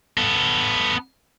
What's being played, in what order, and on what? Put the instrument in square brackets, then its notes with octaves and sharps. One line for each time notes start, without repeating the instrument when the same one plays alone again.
[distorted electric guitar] B3 A4